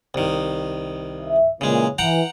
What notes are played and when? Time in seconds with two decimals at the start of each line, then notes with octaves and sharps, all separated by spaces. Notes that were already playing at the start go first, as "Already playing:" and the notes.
0.14 C2 D#3
1.22 E5
1.61 A#2 C#3 E3 G#3
1.98 E3 F#5 G5 A#5